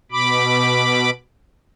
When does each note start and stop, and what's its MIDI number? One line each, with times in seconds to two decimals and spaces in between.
0.12 1.10 47
0.12 1.10 83
0.12 1.10 86